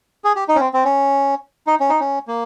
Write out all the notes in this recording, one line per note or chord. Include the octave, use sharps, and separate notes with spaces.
G#4
G4
D#4
C#4
C4
C4
C#4
D#4
C#4
D#4
C#4
A#3